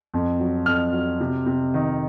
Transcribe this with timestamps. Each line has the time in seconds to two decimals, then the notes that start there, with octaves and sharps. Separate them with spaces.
0.14 F2
0.40 F#3
0.66 F2 F6
0.93 F#3
1.20 C3
1.46 C3
1.74 D#3